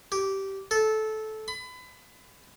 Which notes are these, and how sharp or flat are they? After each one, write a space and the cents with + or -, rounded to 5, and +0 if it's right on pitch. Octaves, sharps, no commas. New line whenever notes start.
G4 -15
A4 -15
B5 +30